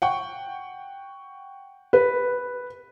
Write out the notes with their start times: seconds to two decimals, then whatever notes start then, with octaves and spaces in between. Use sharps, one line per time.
0.02 F#5 G5 C#6
1.93 B4